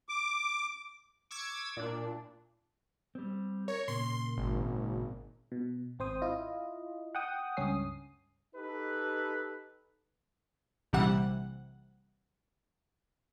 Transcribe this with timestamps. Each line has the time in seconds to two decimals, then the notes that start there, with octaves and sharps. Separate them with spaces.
0.09 D6
1.31 C#6 D6 E6 G#6
1.77 A#2 D4
3.15 G3 C4
3.68 A#4 C#5
3.88 A#2 C#3 A#3 C6
4.38 G#1
5.52 B2
5.99 G#1 C4 C5 D#6
6.22 E4 F4 D#5
7.15 F#5 G5 D#6
7.57 C#2 G2 C#4 D#6 C7
8.56 D#4 G4 A4 B4
10.93 A#1 C3 E3 G3 F#5